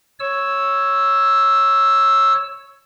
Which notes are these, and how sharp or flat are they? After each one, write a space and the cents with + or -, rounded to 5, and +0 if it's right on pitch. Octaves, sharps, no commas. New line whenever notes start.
C#5 +0 E6 +0